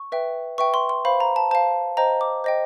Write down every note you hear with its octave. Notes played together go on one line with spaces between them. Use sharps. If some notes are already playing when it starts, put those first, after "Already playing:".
Already playing: C#6
B4 E5 G5
B4 E5 G5 C#6
C6
C6
C5 F5 B5
A#5
A5
C5 F5 A5
C5 D#5 G5 A#5
D6
C5 D#5 G5